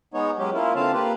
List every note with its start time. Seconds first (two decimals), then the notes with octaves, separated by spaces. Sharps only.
0.14 G#3 B3 D#4 C#5
0.39 F#3 G#3 C#4 G4
0.54 A#3 C#4 E4 F4
0.75 D3 C4 F4 F5 A5
0.93 A#3 F4 G4 B4